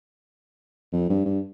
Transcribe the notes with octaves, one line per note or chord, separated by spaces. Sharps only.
F2
G2
G2